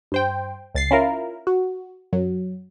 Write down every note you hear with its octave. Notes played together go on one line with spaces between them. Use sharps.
G2 C5 G5
C#2 A6 C7
C#4 E4 F4 A#4
F#4
F#2 F#3